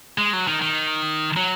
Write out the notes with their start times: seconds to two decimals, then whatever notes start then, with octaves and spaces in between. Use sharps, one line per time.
0.18 G#3
0.33 F#3
0.47 D#3
0.62 D#3
1.37 F#3